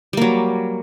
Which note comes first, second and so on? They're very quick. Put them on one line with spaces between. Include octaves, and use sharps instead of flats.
G3 A#3 F#3